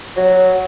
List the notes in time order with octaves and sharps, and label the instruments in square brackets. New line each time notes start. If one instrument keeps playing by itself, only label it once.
[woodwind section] F#3